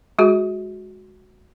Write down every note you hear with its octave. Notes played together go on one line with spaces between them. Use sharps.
G#3 F#4 G#4